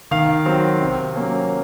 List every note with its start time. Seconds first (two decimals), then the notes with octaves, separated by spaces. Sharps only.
0.11 D#3 F5
0.46 F#3 C4
0.81 C3
1.16 F#3 A#3 C#4